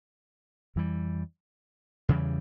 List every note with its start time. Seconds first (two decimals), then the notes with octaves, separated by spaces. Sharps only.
0.76 F2 E3 G3
2.09 E2 C#3 E3 G3